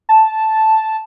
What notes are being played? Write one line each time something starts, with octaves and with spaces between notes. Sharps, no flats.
A5